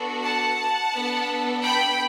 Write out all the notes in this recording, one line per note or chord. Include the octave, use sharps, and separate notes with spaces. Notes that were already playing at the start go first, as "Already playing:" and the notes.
Already playing: B3 D4 F#4 A4
F#5 A5
B3 D4 A4
G5 B5